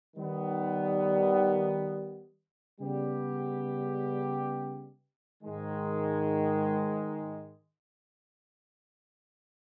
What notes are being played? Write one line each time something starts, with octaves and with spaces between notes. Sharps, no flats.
D#3 G3 B3
C#3 G3 B3 G4
G#2 D#3 G#3